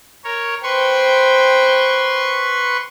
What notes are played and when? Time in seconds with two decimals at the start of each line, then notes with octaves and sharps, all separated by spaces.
0.24 A#4 C#5
0.63 B4 C5 G5 C6 C#6